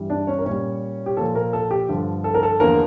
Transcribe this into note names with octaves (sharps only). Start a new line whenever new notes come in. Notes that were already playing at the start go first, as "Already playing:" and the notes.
Already playing: G2 E3 G3
D4 D5
C#4 C#5
A#4
A#2 G3 C#4 C#5
G4
A#2 F3 A4
A#3 A#4
A4
G4
G2 D3 F3 A4
A4
A#4
A4
E2 D3 F3 A#3 A#4